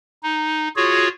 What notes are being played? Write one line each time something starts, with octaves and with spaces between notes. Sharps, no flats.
D#4
F4 F#4 G#4 C#5